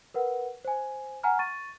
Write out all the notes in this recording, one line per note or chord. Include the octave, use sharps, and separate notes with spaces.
A#4 B4 F#5
C5 G#5
F#5 G#5 A#5 F6
C#6 A6 D#7